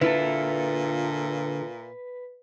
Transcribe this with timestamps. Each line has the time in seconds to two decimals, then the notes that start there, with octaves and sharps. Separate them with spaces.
0.01 A#2 D3 E4 F4 A4 B4